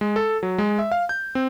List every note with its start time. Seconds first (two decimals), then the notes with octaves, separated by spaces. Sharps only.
0.01 G#3
0.16 A4
0.43 F#3
0.58 G#3
0.79 E5
0.92 F5
1.09 G6
1.35 C4